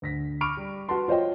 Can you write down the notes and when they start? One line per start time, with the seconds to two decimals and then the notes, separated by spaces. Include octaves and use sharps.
0.02 D2 A#6 B6
0.41 B5 C#6 D6 F6 D7 F7
0.57 G3
0.89 F#4 B4 F#5 A5 C6
1.08 F4 C5 C#5 D#5 G5